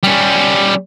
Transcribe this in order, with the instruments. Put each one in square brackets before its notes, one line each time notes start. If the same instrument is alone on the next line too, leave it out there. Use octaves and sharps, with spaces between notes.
[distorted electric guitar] G3 C#4